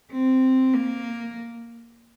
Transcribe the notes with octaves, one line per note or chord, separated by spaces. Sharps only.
C4
A#3